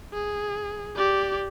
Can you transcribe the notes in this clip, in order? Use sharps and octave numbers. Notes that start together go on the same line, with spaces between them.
G#4
G4 D5